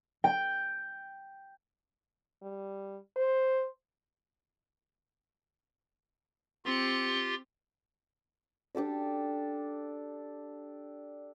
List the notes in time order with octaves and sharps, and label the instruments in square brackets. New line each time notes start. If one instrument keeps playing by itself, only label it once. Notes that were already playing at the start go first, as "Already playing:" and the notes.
[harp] G5
[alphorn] G3
C5
[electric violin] C4 C#7 [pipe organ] F4 G4 C6
[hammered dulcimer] D4 G4 A4 D5